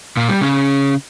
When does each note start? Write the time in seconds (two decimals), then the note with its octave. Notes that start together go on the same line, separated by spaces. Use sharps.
0.17 A#2 A#3
0.29 G3
0.41 C#3 C#4